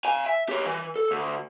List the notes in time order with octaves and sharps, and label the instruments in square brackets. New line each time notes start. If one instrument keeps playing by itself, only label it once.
[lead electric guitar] F5 G#5
E5
G4 C#5
E3
A4
D2